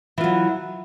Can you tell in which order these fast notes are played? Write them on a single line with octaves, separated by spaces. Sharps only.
E3 F4 F#3